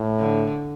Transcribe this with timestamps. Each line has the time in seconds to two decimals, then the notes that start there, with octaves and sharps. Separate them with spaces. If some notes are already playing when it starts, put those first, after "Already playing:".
Already playing: A2
0.19 D3